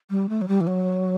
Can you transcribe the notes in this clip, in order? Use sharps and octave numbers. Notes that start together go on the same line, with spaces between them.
G3
A3
F#3
G3
E3
F#3